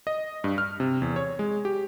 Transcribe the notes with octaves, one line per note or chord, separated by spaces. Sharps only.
D#5
G2
F6
C3
E2
C#5
G#3
G4